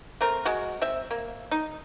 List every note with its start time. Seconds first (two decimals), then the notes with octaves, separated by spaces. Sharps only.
0.21 A3 C4 A#4
0.45 G#3 F#4
0.82 C4 E5
1.11 A#3
1.51 D#4